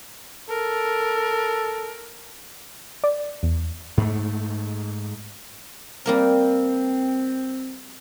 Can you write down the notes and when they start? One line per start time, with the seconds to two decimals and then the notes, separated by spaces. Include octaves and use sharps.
0.50 A4 A#4
3.04 D5
3.43 E2
3.97 G#2 A3
6.06 G3 A#3 C4 A#4